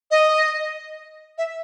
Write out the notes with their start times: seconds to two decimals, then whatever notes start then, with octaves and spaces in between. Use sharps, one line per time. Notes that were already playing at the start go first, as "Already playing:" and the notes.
0.11 D#5
1.38 E5